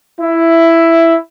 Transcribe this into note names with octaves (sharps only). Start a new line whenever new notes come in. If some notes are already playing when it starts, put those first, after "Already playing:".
E4